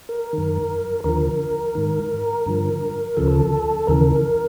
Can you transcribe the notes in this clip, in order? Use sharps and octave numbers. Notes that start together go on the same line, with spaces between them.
A#4
F#2 D#3
D#2 D3 F3 A#4
G#2 D#3
G2 D3 F3
D2 C#3 F3 A4
D#2 C#3 E3 A#4